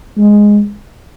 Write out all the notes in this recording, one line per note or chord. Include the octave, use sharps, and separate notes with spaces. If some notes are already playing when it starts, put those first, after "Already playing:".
G#3